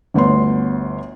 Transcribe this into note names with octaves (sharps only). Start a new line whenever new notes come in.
G1 D2 B3 C#5 C6